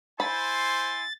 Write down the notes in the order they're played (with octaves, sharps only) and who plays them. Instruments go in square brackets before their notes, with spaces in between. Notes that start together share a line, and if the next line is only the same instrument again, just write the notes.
[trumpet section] E4 G#5 C6 [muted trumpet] C5 [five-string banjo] B5 [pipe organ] A6